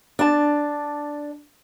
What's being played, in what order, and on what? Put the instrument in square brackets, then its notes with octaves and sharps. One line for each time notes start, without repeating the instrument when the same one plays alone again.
[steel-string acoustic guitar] D4 A5